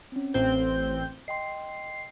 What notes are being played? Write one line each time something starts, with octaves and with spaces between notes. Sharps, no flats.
C4 C#4
A1 C4 C5 G6
D#5 G5 C6 C7